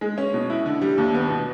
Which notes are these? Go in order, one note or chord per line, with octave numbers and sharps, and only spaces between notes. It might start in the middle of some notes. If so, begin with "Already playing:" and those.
G#3
C#4
B2
E4
D3
G3
D#2
B3
B2